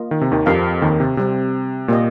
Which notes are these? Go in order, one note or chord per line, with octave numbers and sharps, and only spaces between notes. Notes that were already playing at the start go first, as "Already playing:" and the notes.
Already playing: A#3 F4 D#5
D#3
C3
D#2 D#3
F2 F3 C4 G4 A#4 F5
D#2 D#3
C3
C3 G3 C4 G4
A#2 A#3 G4 D#5